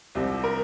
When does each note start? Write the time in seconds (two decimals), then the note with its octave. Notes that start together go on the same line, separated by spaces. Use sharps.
0.15 C2 C3 F3
0.44 A#4